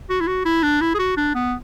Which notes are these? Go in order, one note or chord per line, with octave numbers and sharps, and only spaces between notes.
F#4
E4
F#4
E4
D4
E4
G#4
F#4
D4
B3